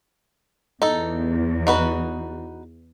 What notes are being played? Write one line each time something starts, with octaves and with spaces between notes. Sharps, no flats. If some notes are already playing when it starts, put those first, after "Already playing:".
E2 D#4 A4
D#4 F#4 B4